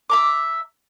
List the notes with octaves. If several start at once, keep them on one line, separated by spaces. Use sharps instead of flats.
E5 A#5 D6